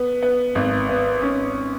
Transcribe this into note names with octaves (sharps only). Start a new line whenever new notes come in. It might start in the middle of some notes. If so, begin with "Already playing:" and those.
Already playing: B3
B3
G#1
B3
C#4